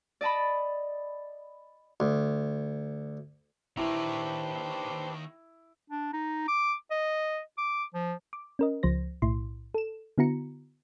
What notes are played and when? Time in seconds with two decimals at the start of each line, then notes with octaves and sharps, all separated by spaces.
0.21 D5 D#5 A5 B5
2.00 D2
3.77 D#2 D#3 D4 E4 G4 B4 C5 A#5
5.90 D4
6.13 D#4
6.48 D6
6.91 D#5
7.58 D6
7.94 F3
8.33 D6
8.59 C#4 A#4 D#5
8.83 C#2 F3 C5 A#6
9.22 B1 A2 E4 C6
9.74 A4 E7
10.18 D3 B3 E4 F#4 A#5 C#7